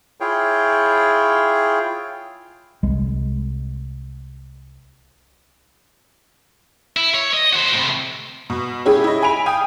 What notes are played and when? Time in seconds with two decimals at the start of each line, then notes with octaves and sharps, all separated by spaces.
0.20 E4 F4 G#4 C#5 G5
2.83 C2 G#3
6.97 E4
7.15 C#5
7.33 D#5
7.53 F#4 C5
7.73 A2 C3
8.50 B2
8.85 G#3 C#4 E4 G4 G#4
9.04 E4 D#5
9.22 G#5 B5 B6 D7 F7
9.46 F5 G5 G#5 D#6